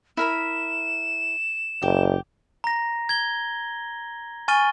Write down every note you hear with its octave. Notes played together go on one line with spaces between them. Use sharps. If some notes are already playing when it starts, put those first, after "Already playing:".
E4 A#4 B5 E7
F#1 G4
A#5 A#6
G#6 G7
G#5 C#6 F6 A6 D#7 G7